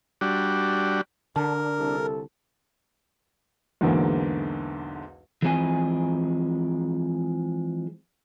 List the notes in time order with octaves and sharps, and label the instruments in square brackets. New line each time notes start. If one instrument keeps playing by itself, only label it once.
[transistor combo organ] G3 D4 F#4
[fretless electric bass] D3 [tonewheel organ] D4 [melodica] A#4
[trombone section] C2 A4
[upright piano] B1 E2 G#2 D3 E3 A#3
[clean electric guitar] E3 F3 G#3 C4 G#4 G#5